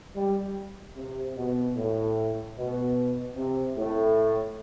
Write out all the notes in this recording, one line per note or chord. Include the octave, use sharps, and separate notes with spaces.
G3
C3
B2
A2
B2
C3
A2